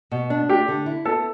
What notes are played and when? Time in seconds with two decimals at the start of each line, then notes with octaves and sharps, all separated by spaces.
0.11 B2
0.30 D4
0.49 A3 G4
0.68 D3
0.86 E4
1.05 B3 A4